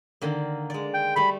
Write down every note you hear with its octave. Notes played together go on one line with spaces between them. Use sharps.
D3 D#3 A#3
G#3 D5
G5
G3 A3 A4 B5